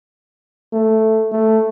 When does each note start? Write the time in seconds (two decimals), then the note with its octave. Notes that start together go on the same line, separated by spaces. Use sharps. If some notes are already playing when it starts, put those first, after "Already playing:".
0.72 A3
1.32 A3